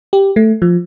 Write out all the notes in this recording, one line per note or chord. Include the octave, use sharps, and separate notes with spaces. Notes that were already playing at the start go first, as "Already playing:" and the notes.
G4
A3
F3